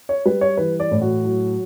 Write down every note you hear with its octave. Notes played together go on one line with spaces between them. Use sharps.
C#5
G3 B4
C#5
E3 B4
D5
A2
F#4
F#3